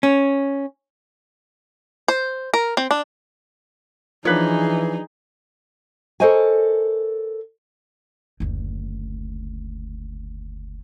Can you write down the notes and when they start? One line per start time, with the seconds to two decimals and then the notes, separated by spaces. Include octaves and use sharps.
0.03 C#4
2.08 C5
2.54 A#4
2.77 C4
2.91 D4
4.25 E3 F3 D4 D#4 G#4 B4 C#5
6.20 A4 A#4 C5 C#5 D#5 G#5
8.40 F#1 D2